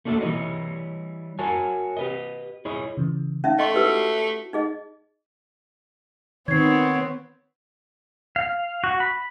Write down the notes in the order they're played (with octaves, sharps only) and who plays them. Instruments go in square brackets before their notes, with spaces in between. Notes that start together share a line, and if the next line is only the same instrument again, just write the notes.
[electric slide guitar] A3 A#3 D4 F#4 A4
E3 G3 E4 A#4 C#5 D#5
F#4 A#4 C#5 G#5 A5
G4 B4 D#5
E4 G#4 C#5 D#5
[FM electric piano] C#3 E3
[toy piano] C#4 D#4 E5 [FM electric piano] F5
[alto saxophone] A3 [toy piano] D#5 C6 C#6
[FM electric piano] E4 F#4 [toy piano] G4 B4 E6
[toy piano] D#4 G#4 D#5
[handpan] D#3 [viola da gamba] B3 C4 [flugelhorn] C#5 [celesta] G#6 C7
[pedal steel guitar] F5
F#4
B5